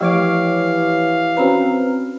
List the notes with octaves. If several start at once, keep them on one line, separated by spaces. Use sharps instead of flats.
E3 F3 A3 G4 C#5 F5 D6
C4 C#4 F#4 B4 A#5